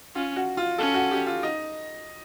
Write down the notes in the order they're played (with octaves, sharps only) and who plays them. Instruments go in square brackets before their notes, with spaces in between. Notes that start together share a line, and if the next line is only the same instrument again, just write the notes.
[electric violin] C#4 [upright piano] F4
[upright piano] F#4
F4
[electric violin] C#4 [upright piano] A4
[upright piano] F#4
G4
F4
D#4